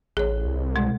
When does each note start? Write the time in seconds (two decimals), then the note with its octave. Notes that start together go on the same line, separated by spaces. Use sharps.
0.17 A1 G#4 C#5
0.45 C2
0.76 B2 G#3